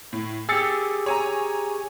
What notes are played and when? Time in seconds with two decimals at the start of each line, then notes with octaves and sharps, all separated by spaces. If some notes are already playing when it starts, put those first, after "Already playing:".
0.13 A2
0.49 G4 G#4 E6 A6 C#7
1.06 C#5 G#5 A#5